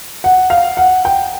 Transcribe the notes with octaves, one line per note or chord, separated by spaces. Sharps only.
F#5
F5
F#5
G5